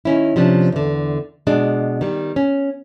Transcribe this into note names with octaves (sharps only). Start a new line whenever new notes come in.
D#3 C#4 E4
C3 F3 C#4 D4
E2 D3
B2 G#3 D4
D#3 G3
C#4